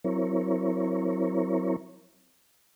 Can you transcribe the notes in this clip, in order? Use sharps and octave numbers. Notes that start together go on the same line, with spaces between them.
F#3 C4 E4 A#4 C#5